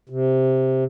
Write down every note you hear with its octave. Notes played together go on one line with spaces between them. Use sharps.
C3